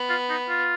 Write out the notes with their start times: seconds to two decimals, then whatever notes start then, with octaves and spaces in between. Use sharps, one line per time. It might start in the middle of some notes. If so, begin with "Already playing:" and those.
Already playing: B3
0.09 F4
0.29 D#4
0.49 F4